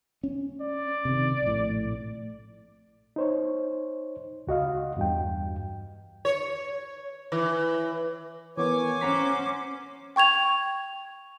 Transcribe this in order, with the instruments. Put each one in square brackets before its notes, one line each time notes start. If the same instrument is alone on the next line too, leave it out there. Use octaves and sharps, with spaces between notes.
[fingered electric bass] C#4
[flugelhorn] D5
[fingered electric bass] C3 D#3
A#1 A2
[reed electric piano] D#4 C5 C#5
C#2 F#4 D#5 F5
E2 G2 G5
[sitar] C#5
E3
[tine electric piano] E3 B3 A#4 [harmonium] C#5 G#5 [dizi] D6
[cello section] C#4 C5 [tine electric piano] F#5 A#5 B6
[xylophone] G5 C#6 G#6 F7